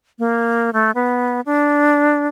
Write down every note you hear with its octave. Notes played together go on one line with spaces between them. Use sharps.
A#3
A3
B3
D4